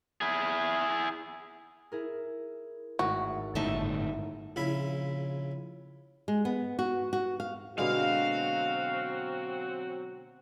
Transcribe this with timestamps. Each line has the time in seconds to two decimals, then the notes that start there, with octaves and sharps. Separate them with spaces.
0.21 E4 G#4
1.92 E4 G#4 A#4
2.99 G#1 A2 F#4
3.55 G1 A2 D#4 E5 A5
4.56 A#1 C#3 E4 B5
6.28 G#3
6.45 B3
6.79 F#4
7.13 F#4
7.40 F5
7.78 B2 D3 F#3 G#3 C4 F#4 F5